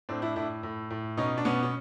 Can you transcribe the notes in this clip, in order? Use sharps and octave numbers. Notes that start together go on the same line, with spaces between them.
A2 C4 D4
D4 E4
A2 D4 E4
A2
A2
B2 C#4 D#4
D4
B2 B3 C#4
C#4